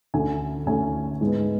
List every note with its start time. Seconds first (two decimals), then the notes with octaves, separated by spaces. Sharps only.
0.14 D2 D3 A3 C#4 G#5
0.67 D2 D3 A3 C#4 G#5
1.21 G#2 G#3 B3